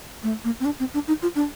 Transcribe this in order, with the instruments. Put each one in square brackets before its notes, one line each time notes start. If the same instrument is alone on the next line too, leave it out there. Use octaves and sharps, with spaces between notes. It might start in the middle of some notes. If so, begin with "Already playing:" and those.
[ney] A3
A#3
C4
D4
C4
D4
D#4
F4
D4